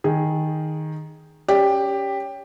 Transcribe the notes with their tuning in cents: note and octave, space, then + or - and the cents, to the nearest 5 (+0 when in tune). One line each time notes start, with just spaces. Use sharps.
D#3 +0 G#4 +0
C#4 +20 G4 +10 D5 +0